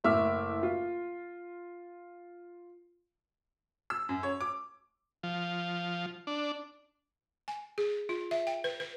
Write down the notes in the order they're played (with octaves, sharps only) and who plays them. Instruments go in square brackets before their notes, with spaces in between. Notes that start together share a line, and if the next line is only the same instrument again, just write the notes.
[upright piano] F#1 A2 E5 D6 E6 F6
F4
E6
F#2
C#5
D6
[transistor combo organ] F3
D4
[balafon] G#5
G#4
F4
E5
G5
B4
B4